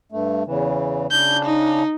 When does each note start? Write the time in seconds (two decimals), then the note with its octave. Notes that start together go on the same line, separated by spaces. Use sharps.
0.12 G2 A3
0.46 E2 C#3 E3
1.11 C#3 D4 G6
1.45 D#4